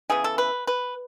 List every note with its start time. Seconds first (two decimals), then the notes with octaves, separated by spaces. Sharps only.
0.10 C#3 E3 B3 G#4
0.24 A4
0.38 B4
0.67 B4